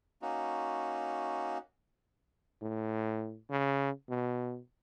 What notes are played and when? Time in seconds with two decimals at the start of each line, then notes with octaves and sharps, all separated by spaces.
0.22 A#3 C#4 D#4 F#4
2.62 A2
3.50 C#3
4.09 B2